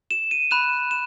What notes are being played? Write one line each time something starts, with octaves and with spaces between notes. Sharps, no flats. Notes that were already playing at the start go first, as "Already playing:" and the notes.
E7
D#7
B5 F#6 E7
E7